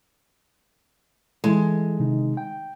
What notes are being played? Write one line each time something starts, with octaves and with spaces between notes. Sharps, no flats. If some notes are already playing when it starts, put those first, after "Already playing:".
E3 G#3 E4 A4
C3 D#3 D#4
G5